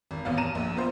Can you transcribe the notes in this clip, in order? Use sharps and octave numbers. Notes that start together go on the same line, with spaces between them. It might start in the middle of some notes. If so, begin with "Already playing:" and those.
G#1
A1 B3 F5
A#5 D#7 E7
A#1
B3 F4 C5